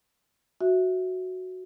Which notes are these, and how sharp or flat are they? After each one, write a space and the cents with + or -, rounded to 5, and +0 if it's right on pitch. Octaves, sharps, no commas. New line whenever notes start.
F#4 +0 E5 +0